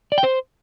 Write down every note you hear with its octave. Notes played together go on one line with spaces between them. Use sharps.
D5
G5
C5